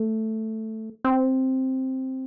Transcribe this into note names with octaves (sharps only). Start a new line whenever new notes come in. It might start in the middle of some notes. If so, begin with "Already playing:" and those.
Already playing: A3
C4